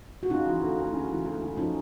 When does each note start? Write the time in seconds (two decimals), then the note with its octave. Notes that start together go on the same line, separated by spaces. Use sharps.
0.23 F#4
0.30 C#3 D#4 F4
0.47 E3
0.62 D2
0.78 D2
0.94 C#3
1.10 E3
1.26 D2
1.42 D2
1.57 F3 C#4 D#4